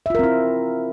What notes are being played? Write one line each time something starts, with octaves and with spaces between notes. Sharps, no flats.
C4 E4 F4 A#4 E5